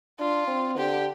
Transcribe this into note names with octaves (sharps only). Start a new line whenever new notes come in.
D4 F4
C4
D3 G4